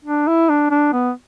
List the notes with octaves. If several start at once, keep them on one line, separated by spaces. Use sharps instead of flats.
D4
E4
D4
D4
B3